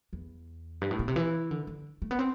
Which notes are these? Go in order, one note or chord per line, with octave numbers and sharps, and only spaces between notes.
E2
G2
A2
B2
C3
E3
D3
D3
A3
B3
C4